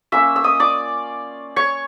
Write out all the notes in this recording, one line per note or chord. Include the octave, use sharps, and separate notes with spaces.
A#3 C#4 F4 E5 E6
E6
D#5 D#6
D5 D6
C#5 C#6